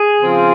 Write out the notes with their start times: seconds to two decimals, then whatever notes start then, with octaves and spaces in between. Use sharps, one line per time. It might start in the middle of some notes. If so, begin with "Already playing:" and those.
Already playing: G#4
0.20 C#3 F3 C4 F4